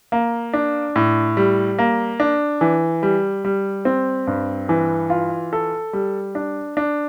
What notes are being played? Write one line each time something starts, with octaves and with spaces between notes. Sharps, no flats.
A#3
D4
A2
G3
A#3
D4
E3
G3
G3
C4
G2
E3
F4
A4
G3
D4
D4